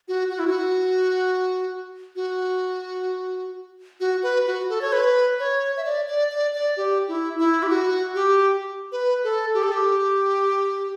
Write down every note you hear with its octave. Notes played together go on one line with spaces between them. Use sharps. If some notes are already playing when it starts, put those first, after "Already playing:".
F#4
F#4
E4
F#4
F#4
F#4
B4
F#4
A4
C#5
B4
C#5
E5
D5
D5
D5
D5
G4
E4
E4
G4
F#4
G4
B4
A4
G4
A4
G4